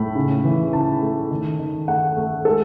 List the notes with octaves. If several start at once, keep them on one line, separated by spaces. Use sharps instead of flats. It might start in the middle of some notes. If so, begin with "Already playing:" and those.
Already playing: A2 B5
C#3
E3
C#3 A5
A3
D#3
D#3
A3 F#5
A3
G#3 A4